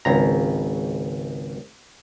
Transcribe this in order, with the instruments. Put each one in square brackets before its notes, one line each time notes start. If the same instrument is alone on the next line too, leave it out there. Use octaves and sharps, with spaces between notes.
[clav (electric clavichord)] G#1 C#2 A#5